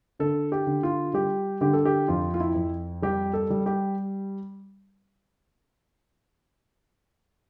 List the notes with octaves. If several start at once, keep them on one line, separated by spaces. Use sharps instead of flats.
D3 A4
G4
D3
F4
G3 G4
D3 G4
A4
G4
F2 F4
F4
E4
F2
G3 G4
A4
G3
G4